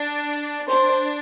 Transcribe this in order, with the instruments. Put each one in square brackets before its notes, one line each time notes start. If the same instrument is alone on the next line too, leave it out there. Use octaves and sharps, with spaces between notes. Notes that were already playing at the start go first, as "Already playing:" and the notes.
Already playing: [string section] D4
[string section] D4 [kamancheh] C5